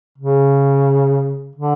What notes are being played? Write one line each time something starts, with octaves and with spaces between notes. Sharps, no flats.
C#3
D3